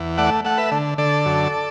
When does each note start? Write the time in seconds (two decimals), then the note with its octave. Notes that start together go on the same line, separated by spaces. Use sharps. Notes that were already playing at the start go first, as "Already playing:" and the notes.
Already playing: E2
0.18 A3 D5 F#5
0.45 A3 F#5
0.58 B4 E5
0.72 D3
0.98 D3 A4 D5
1.25 F#2